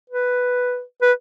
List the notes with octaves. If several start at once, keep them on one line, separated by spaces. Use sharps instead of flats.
B4
B4